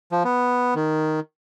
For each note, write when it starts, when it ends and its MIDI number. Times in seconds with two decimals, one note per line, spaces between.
0.12 0.23 53
0.25 0.74 59
0.75 1.20 51